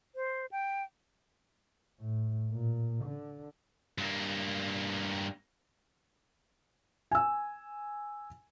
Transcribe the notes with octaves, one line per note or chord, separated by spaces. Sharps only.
C5
G5
A2
A#2
D3
G2 A#3
G#5 E6